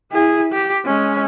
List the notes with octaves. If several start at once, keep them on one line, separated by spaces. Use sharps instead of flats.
E4 G#4
G4
G#3 C#4